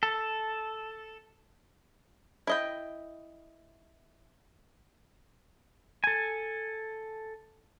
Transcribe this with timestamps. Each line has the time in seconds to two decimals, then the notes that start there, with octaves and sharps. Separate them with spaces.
0.03 A4
2.47 E4 D#5 G5
6.04 A4 G#5